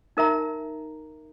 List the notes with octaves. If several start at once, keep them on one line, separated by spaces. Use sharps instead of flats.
D#4 A#4 E5 A#5